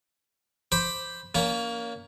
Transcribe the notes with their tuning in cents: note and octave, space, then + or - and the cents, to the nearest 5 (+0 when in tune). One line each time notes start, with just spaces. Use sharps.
C5 +0 B5 +0 D6 +0
A#3 +5 C#4 +35